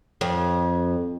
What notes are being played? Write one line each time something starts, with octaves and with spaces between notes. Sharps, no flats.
F2